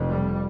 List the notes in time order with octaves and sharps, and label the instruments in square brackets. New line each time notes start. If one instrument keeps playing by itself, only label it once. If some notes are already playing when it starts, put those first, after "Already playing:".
Already playing: [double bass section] F1 F2 C3
G3